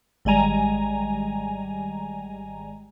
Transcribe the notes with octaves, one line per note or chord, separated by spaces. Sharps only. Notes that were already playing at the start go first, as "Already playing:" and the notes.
G#1 G3 G#3 G#5 A#5